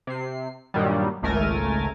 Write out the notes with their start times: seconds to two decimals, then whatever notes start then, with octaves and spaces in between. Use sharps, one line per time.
0.07 C3 C7
0.74 G2 A#2 D#3 F#3 G3
1.22 G#1 C#2 A3 A#4 G#5 A6